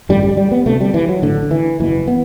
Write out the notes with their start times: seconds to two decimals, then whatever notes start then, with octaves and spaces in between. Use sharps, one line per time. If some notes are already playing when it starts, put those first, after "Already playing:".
0.09 A1 G2 D3 G3
0.23 G3
0.37 G3
0.52 B3
0.66 D2 C3 A3
0.81 G3
0.94 E3
1.09 F#3
1.22 A1 A2 D3
1.51 E3
1.80 F#1 E2 B2 E3
2.07 B3